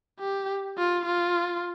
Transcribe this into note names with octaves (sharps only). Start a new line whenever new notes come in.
G4
F4
F4